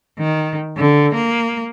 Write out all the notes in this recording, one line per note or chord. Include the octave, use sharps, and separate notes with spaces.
D#3
D3
A#3